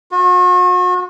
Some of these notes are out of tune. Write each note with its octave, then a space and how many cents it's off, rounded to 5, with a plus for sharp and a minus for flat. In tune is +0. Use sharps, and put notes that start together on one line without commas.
F#4 -40